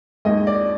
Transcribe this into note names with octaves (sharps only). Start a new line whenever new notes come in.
D#2 D#3 G#3 D#5
D5